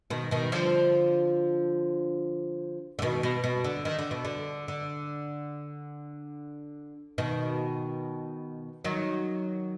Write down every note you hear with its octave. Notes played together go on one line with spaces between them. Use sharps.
B2 D#3
B2 D#3
D3 F3
D3
B2 D#3
B2
B2
D3
D#3
D3
B2
D3
D3
B2 D#3
D#3 F#3